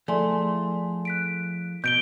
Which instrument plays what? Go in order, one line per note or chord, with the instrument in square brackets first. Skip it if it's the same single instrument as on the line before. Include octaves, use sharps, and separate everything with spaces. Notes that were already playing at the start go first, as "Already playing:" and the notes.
[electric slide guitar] F3 E4 G#4 [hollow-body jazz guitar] A3 [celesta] D5 G#5 C6
[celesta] F#6 B6 D7
[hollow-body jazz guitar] B2 [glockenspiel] G6 D7 G7